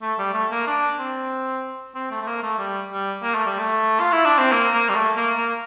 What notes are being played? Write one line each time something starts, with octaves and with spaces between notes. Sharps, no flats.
A3
G3
A3
A#3
D4
C4
C4
A3
A3
A#3
A3
G3
G3
A#3
A3
G3
A3
F4
E4
D4
C4
A#3
A#3
G3
A3
A#3
A#3